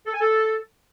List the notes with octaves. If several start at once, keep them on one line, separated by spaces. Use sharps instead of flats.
A4
G#5
A4